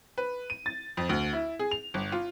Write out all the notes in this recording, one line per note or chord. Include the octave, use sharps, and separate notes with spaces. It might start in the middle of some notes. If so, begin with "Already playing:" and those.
B4
D#7
A6
F2
D2
E4
G#4
F7
G1
F4